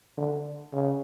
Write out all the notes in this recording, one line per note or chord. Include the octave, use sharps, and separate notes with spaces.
D3
C#3